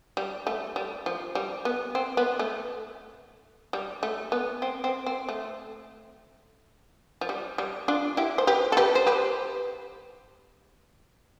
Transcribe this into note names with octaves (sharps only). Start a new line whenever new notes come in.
G3
A3
G3
F3
G3
B3
C4
B3
A3
G3
A3
B3
C4
C4
C4
A3
F3
G3
G3
D4 F4
E4 G4
C5
G4 B4
A4
G4 B4
C5
G4 B4